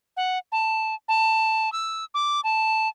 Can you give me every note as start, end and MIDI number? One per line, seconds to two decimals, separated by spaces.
0.17 0.38 78
0.52 0.95 81
1.08 1.72 81
1.72 2.04 88
2.14 2.41 86
2.44 2.88 81